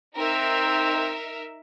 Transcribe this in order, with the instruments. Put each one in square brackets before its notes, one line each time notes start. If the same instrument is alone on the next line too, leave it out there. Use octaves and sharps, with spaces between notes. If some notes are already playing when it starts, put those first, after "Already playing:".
[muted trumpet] C4 [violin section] D#4 A#4 E5